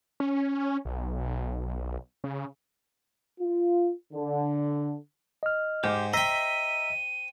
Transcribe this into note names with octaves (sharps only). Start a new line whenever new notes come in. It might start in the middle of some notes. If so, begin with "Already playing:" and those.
C#4
B1
C#3
F4
D3
D#5 F6
G#2 G4 C5 D6
C5 D#5 E5 G5 A#5 E6 B6 D#7